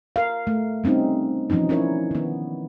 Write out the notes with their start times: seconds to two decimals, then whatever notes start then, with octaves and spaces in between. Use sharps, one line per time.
0.16 A#4 F5
0.47 A3
0.84 G3 C4 C#4 D#4
1.50 E3 F3 B3 C#4 D#4
1.69 C#4 D4 E4 A#4 C#5
2.11 D#3 B3